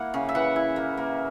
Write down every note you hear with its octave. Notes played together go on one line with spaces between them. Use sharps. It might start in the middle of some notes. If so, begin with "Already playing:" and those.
Already playing: A#3 E4 F#5
C#3
E5
E3 F#5
E4
A#3
A#3